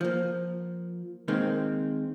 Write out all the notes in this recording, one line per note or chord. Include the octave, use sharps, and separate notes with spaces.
F3 A#3
D#3 G#3 A#3 C4